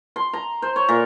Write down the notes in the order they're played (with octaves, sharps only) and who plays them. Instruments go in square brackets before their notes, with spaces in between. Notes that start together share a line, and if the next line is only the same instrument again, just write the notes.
[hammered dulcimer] C6
A#5
C5
C#5
A#2